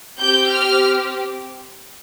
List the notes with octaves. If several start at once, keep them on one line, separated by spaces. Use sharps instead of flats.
C4 G4 G6
F6